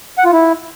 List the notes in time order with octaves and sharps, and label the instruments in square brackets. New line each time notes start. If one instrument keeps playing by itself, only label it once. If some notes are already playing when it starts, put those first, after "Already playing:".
[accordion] F#5
F4
E4